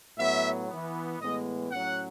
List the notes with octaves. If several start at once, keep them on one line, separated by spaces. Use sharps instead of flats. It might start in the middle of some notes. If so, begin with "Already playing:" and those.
A2 F#3 B3 E5
E3 B3
A2 E3 G#3 B3 D#5
A2 F#3 C#4 F#5